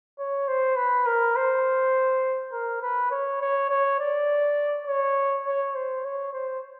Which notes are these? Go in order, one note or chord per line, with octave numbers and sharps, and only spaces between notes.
C#5
C5
B4
A#4
C5
A#4
B4
C#5
C#5
C#5
D5
C#5
C#5
C5
C#5
C5